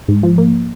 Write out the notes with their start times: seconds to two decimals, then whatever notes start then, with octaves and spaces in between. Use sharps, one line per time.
0.08 G#2
0.23 F3
0.38 A#3